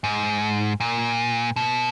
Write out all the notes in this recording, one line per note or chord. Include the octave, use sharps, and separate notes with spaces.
G#2
A#2
B2